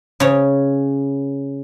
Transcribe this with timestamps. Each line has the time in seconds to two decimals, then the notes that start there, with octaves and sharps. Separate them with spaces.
0.20 C#3 C#5